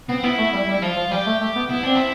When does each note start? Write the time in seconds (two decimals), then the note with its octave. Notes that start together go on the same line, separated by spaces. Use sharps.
0.09 B3 C4
0.23 B3 E4
0.38 A3
0.53 G3
0.68 G3
0.74 E4
0.82 F3 F4
0.96 F3
1.11 G3 G4
1.26 A3
1.41 A3
1.56 B3
1.69 B3 E4
1.83 C4 D4
1.95 E4